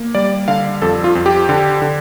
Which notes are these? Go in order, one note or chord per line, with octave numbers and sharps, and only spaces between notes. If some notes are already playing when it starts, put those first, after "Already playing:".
Already playing: A#3
G3 D5
D3 F5
F2 A4
F4
F2
G4
D3
D3